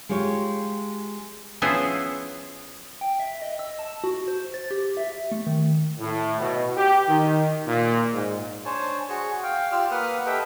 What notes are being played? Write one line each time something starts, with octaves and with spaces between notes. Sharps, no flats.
G#3 F4 G4 C#5
F3 B3 C#4 E4 G#4 C5
G5
E5
D#5
E6
A5
F#4
C5
A6
G4
E5
A3
D#3
A2
B2
G4
D#3
A#2
G#2
D4 C5 C#5 G#5 A5
F#4 G#4 C#6
F5 G5
F4 G4 D5 E6 F6
A#3 B4 F#5 D#6 F6
G4 A4 B4 D#5 E5 G5